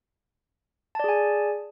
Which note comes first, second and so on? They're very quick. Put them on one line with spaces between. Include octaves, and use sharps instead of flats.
A5 D5 G#4 G#5